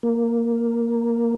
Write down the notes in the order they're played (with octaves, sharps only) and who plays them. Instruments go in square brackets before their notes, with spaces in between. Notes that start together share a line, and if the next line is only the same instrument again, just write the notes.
[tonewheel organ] A#3